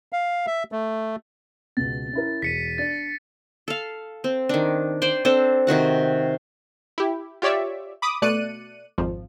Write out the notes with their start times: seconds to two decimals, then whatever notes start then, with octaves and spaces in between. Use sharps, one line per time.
0.13 F5
0.47 E5
0.72 A3
1.77 C#2 B2 A6
2.13 C#4 E4 A#4
2.42 E1 B6 C#7 D#7
2.78 D4 D5 A6
3.68 A4 F5
4.24 C4
4.49 D#3 D4
5.02 C5 D5 G5 C6
5.25 C4 D4 A4 C5
5.67 C3 D#3 F#4 F#5
6.98 E4 G4
7.42 F4 G4 C#5 D5 E5
8.02 B5 D6 D#6
8.22 B2 A3 D5 F#6 C#7 D#7
8.98 G#1 F2 F3